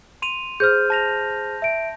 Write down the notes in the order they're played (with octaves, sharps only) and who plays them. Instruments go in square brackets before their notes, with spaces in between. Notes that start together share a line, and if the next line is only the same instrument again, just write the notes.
[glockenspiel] C6 D#7 F7
[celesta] G#4 C5 F6 [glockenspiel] G6
[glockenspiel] A5 A#6 F7
[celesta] E5 D7